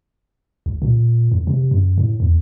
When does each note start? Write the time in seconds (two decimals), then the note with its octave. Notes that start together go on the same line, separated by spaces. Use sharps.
0.66 C2
0.82 A#2
1.32 F2
1.47 C3
1.71 F#2
1.98 A2
2.20 E2